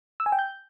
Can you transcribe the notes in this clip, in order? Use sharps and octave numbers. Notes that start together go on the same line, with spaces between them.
E6
G#5
G5
G6